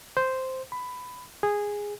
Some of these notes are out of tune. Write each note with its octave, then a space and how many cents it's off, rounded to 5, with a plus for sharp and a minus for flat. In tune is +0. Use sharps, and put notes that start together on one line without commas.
C5 -5
B5 +15
G#4 -10